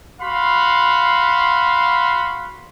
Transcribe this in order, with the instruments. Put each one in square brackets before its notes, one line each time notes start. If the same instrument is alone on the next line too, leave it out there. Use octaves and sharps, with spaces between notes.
[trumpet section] F#4 F5 B5 C6